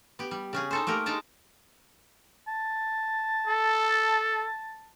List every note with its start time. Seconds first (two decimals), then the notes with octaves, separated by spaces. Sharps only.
0.19 B3 G4
0.31 G3
0.53 C#3 C#4 G#4
0.71 D#4 A4 C5
0.87 A3 A#3 G4 A#4
1.06 G#3 D#4 G5 A5 A#5
2.48 A5
3.47 A4